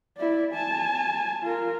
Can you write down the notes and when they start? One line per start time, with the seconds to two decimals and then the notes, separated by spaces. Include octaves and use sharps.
0.17 E4 D5
0.53 G#5 A5
1.43 F4 A#4